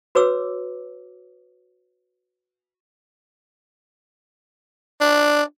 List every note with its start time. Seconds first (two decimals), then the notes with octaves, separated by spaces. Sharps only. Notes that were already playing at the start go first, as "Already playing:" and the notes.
0.15 F#4 B4 C#5 D6 E6
5.01 D4